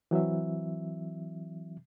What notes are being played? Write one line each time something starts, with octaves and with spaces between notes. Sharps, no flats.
E3 F#3 C4 E5